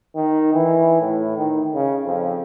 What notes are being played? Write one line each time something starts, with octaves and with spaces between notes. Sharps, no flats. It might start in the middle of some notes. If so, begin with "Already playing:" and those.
D#3
E3
A2
D#3
C#3
F2